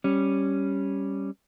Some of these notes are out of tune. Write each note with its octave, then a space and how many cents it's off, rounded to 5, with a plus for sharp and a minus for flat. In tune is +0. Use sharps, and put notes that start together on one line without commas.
G3 +0 C#4 -5